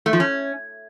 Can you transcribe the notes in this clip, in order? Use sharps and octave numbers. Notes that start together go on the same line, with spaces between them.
A3
F3
C#4